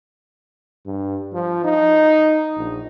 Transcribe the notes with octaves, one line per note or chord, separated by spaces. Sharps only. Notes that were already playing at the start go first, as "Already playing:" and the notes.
G2
F3
D#4
A#1